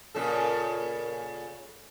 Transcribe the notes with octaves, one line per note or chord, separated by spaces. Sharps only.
A#2 C#3 A4